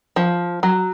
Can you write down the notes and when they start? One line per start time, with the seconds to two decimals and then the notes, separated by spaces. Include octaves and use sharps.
0.16 F3
0.63 F#3